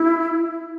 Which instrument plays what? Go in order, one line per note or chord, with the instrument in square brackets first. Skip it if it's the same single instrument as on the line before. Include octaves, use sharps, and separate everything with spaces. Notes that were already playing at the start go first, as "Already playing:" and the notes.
Already playing: [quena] E4